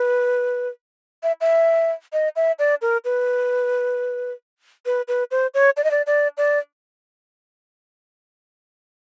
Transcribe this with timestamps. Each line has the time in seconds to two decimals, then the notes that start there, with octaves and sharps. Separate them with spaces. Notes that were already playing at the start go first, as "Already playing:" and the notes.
Already playing: B4
1.23 E5
1.41 E5
2.13 D#5
2.36 E5
2.59 D5
2.82 A#4
3.05 B4
4.86 B4
5.08 B4
5.31 C5
5.54 C#5
5.77 D5
5.84 D#5
5.91 D5
6.07 D5
6.38 D5